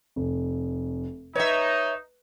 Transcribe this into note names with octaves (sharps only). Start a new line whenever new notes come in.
F1
D#4 B4 C#5 E5